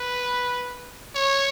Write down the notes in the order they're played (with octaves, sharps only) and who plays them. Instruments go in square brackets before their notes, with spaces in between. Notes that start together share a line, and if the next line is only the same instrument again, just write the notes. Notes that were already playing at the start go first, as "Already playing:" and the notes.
Already playing: [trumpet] B4
C#5